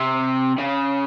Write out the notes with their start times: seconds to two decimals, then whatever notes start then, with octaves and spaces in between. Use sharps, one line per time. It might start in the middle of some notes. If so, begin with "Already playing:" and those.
Already playing: C3
0.58 C#3